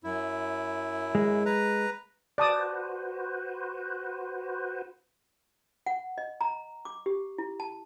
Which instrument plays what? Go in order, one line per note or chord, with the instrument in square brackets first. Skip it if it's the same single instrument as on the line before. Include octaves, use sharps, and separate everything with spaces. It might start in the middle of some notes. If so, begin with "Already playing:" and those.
[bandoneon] F#2 E4
[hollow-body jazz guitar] G#3
[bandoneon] B4 A#5
[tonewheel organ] F#4 B4 C5 [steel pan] D5 A5 D#6
[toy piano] F#5
D#5
A#5
D6
G4
E4
A5